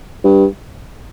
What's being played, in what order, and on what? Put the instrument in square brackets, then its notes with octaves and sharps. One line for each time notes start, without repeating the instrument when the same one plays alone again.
[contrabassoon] G2